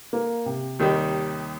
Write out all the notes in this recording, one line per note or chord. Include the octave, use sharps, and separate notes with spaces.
A#3
C3
D#2 D#3 G3